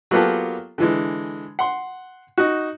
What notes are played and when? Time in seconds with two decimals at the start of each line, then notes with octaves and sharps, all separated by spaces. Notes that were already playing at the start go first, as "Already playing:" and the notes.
0.11 F#3 A#3 B3 F4 G4 A4
0.78 D3 E3 G#3
1.59 F#5 C6
2.38 D#4 F#4